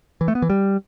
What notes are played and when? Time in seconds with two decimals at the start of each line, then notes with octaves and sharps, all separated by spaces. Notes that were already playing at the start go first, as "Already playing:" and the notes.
0.21 E3
0.28 A3
0.35 B3
0.42 E3
0.50 G3